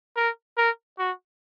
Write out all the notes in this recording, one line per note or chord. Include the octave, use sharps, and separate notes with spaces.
A#4
A#4
F#4